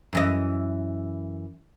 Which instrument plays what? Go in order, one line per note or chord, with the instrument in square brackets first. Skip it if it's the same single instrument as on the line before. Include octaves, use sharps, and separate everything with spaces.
[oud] F#2 E3 D#5